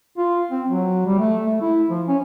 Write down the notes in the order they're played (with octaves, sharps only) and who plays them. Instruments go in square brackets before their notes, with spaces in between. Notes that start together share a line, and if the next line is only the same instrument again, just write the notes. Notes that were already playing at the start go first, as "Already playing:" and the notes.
[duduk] F4
C4
F#3
G3
A3
A3
E4
F3
C#4